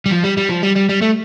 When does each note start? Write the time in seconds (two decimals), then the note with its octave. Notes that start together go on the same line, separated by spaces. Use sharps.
0.06 G3
0.11 F3
0.24 G3
0.37 G3
0.49 F3
0.63 G3
0.75 G3
0.89 G3
1.02 A3